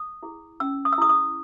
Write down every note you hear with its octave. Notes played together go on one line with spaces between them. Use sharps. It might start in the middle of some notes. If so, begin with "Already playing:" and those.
Already playing: D#6
E4 G#4
C#4 E6
D#6
E6
E4 G#4 D#6
D#6